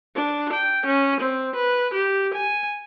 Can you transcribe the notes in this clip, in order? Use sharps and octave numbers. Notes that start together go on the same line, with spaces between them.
D4
G5
C#4
C4
B4
G4
G#5